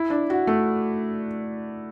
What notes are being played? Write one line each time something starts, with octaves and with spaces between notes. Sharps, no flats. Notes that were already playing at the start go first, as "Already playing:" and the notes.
Already playing: E4
D4
F#4
A3